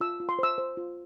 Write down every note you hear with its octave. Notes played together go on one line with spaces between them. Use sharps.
F4 E6
F4
C6
C5 E6
C5
F4